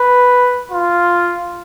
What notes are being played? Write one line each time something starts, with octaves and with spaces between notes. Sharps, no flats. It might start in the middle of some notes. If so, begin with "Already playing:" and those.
Already playing: B4
F4